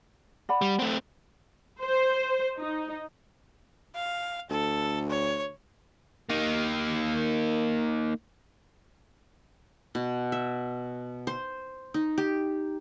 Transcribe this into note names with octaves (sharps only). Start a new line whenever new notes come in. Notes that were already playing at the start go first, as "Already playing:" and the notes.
D5 F#5 B5
G3
A3 C4
C5
D#4
F5
D2 A4
C#5
A#3 D#4
B2
E5
C5
D#4
G4